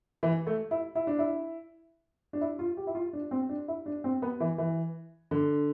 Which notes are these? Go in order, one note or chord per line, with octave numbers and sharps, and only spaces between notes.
E3
A3
E4
E4
D4
E4
D4
E4
F4
G4
E4
F4
D4
C4
D4
E4
D4
C4
B3
E3
E3
D3